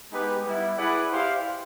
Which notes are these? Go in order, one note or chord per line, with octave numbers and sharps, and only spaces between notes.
G#3 B3 D#4 G4 B4
G3 B3 E4
E4 G#4 B4 D5 F#5
E4 G4 C5 F5